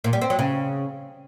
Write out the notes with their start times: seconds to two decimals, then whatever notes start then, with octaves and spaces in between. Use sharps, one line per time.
0.04 A#2
0.13 G3
0.21 C4
0.30 F#3
0.39 C#3